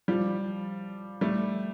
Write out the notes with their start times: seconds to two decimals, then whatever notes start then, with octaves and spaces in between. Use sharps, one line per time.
0.08 F3 G3
1.21 G3 A3